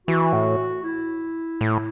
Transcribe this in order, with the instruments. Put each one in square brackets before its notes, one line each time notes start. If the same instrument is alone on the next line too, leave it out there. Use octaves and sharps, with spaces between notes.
[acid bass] E3 [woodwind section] F#4
[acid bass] A2
[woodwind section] E4
[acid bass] A2